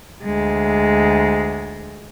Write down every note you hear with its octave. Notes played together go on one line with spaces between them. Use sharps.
D2 G#3